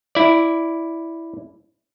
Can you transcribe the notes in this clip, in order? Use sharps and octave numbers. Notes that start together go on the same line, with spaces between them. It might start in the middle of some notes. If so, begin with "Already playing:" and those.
E4 D5